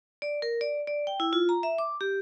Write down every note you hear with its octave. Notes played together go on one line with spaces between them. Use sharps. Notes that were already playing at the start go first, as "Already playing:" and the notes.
D5
A#4
D5
D5
G5
E4
F4
A#5
E5
D6
G4